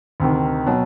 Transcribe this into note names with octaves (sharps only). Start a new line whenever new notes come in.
D2 C3 D#3
B2 F#3